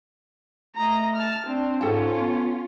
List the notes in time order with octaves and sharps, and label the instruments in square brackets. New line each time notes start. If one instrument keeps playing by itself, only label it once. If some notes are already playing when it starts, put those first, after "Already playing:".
[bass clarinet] A3 [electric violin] D#5 A#5
[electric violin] A5 F6
[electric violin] C4 [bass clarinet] D4
[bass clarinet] G#2 [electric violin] C#4 F4 [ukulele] A4 G5 A5
[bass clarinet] B3